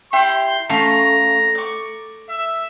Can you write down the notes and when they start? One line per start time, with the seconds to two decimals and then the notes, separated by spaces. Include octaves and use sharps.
0.13 E4 G4 G5 C6
0.69 A3 C#4 F4 F5 A#5
1.55 D5 C#6
2.29 E5